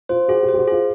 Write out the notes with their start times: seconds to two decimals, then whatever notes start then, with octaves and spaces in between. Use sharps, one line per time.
0.09 F4 C5
0.29 F#4 G#4
0.43 G4
0.49 C5
0.54 G4
0.58 F#4
0.68 F4 G#4